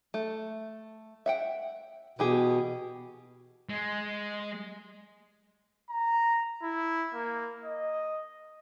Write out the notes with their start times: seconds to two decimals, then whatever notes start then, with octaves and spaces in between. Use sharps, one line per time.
0.14 A3
1.26 E5 F#5 G5
2.19 B2 E3 G4 G#4
3.70 G#3
5.90 A#5
6.63 E4
7.14 A#3
7.64 D#5